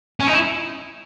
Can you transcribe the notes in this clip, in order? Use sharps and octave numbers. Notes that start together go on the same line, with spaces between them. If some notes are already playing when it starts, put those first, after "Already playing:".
C#4
D#4
E4